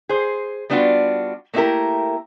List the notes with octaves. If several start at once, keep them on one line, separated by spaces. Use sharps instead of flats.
G#4 C5
G3 B3 D4 F4 F#4
A3 A#3 D4 E4 G4 A#4